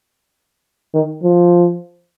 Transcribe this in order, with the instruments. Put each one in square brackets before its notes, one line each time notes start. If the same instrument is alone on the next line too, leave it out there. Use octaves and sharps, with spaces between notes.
[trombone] D#3
F3